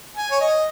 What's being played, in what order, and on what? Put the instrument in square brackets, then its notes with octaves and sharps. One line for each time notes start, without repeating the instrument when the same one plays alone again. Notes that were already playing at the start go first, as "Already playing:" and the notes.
[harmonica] G#5
C#5
D#5